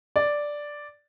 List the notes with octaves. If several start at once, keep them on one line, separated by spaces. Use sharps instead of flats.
D5